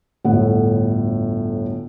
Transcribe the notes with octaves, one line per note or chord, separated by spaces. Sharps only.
G1 D2 A2 F#5